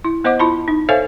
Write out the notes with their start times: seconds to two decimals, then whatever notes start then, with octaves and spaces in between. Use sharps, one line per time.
0.04 E4
0.24 B3 C5 D#5 F#5 D6
0.39 E4 F4 A5 B5
0.68 D#4
0.89 A4 C5 C#5 E5 F5 G#5